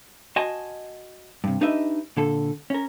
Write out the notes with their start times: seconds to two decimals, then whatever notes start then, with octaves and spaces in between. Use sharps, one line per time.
0.36 F#4 D#5 G#5 A5 C6
1.44 G2 C3
1.61 D4 D#4 G4 B4 D#5 E5
2.17 A#2 D3 A4
2.70 C#4 A#4